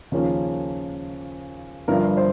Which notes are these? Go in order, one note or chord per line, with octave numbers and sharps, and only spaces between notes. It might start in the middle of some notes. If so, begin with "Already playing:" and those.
D#2 C#3 F3 A#3 C#4
G1 G2 F3 A#4
C5